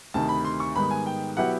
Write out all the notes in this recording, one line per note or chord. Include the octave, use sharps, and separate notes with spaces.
D2 C3 D#3 A5
B5
C6
C#6
G#2 D#3 G3 B3 D#4 B5
G#5
G5
B2 F#3 B3 E4 G4 F#5